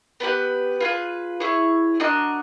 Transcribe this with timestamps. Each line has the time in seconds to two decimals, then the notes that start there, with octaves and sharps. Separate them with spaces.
0.20 B3 D4 G4 B4
0.80 F4 G#4 B4
1.40 E4 G#4 C#5
2.00 D4 F#4 A#4 D#5